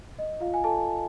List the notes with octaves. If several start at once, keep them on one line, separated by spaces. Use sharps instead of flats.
D#5
F4 F5
G#5
A4 A5